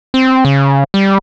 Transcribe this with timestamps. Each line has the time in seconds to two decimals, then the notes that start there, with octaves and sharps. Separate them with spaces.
0.14 C4
0.45 C#3
0.94 G3